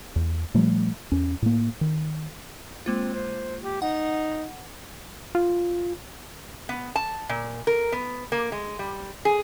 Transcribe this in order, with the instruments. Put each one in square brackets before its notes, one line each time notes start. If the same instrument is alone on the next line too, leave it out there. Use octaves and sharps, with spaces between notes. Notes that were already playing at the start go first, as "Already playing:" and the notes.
[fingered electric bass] E2
A#2 F3 G3 A3
E2 C#4
A2 A#3
D#3
[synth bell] G#3 A#3 F4 [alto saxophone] C4
[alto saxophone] C5
G4
[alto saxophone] D#4 [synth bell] F#5
[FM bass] F4
[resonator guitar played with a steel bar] B3
A5
A#2
A#4
B3
A#3
G#3
G3
G#4